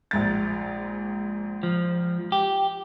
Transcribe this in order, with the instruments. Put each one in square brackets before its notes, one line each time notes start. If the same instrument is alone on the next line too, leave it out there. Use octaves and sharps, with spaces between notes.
[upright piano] A#1 G#2 A6
[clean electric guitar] F3
G4